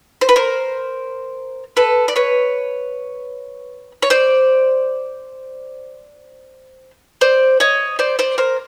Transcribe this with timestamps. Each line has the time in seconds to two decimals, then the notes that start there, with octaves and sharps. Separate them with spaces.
0.21 C5
0.29 B4
0.36 A#4 C5
1.77 A4 B4
2.08 D5
2.16 B4 C#5
4.02 C#5
4.10 C5 D5
7.21 C5 D5
7.60 C#5 D#5
7.99 C5 D5
8.19 C5 D5
8.38 A#4 C5